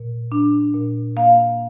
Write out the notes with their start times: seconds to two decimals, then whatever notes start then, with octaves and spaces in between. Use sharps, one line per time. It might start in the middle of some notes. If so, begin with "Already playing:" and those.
Already playing: A#2
0.32 D4
0.74 A#2
1.17 A#3 F5